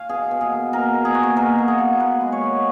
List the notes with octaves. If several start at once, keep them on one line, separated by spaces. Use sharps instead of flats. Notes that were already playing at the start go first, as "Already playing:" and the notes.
Already playing: F5 G#5
B2 G#4
B2
G#4
A#3
B2 A#4
A#3
G#4
A#3 F#4
G#4
B2 A#4
A#3
G#4
A#3
B3 B4
G#3
C#5
G#3